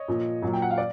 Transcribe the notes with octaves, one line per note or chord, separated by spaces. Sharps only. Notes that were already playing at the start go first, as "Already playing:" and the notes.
Already playing: C#5 D#5
A#2 F3
A#2 F#3
G5
F#5
F5
D5